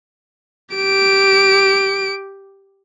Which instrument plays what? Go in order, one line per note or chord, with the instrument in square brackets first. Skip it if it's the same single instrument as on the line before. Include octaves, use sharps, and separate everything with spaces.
[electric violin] G4 D7